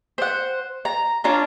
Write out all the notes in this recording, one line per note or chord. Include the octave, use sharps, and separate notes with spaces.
C5 F#5
A#5
C#4 D4 F4 A#5